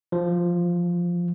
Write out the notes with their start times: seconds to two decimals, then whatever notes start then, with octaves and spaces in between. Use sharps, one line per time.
0.12 F3